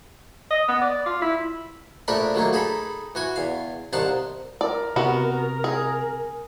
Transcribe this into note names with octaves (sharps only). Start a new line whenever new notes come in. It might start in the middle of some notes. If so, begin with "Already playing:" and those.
D#5
B3
D5
F4
E4
A#1 A3 D4 A#4 B5
D#3 F#3 A3 A#3
D#4 G#4 A4 B5
E3 F#4 G#5
E2 F5
C2 C3 D#3 F5 F#5 A5
A#4 D5
C3 B3 F#4
G#4